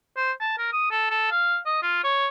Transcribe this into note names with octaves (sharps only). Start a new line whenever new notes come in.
C5
A5
A#4
D#6
A4
A4
F5
D#5
F4
C#5